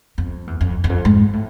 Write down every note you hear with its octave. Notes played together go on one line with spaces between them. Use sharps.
F2
E2
F2
E2
F2
G#2
A2